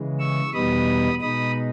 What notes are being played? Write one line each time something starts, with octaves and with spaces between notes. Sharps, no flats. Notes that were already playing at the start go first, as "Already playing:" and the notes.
Already playing: C#3 E3 G#3
C#6 E6
E2 B2 G3 B3 D#4 B5 D#6
B2 G#3 D#4 B5 D#6